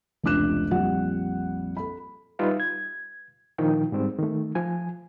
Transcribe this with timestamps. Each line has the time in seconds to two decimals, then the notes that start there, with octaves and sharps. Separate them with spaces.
0.23 F1 C#2 D4 D6 F#6 E7
0.71 A#1 F2 G3 F#5
1.77 A4 B5
2.39 G3 D#4 F4 B4 E5
2.60 G#6
3.58 A#2 D#3 F3 D#4 G5
3.92 G#2 G3 C4
4.18 D#3 A3
4.55 F3 G#5